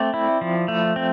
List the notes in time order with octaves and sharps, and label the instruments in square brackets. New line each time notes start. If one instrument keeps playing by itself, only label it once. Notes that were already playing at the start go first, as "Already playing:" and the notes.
Already playing: [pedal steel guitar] A3 C4 D5
E4
F3
A3
C4